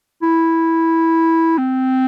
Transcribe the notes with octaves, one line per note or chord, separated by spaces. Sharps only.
E4
C4